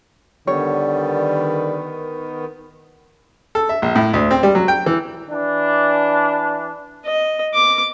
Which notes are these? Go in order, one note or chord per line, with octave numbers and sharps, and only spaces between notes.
D3 D#3 G3 B3 C#5
A4
E5
A#1
A2
D2
C4
G3
F#3
G5
E3
E3 D4
D#5
D6